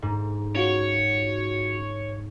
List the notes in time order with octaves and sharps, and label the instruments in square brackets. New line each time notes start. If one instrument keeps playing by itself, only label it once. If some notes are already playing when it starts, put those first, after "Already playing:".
[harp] G#2
[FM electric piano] C#4 F4 F#4 [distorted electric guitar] C#5